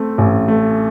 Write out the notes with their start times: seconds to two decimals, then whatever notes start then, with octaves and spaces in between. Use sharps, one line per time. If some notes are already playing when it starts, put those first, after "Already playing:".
Already playing: A3 C4
0.18 A1
0.48 A3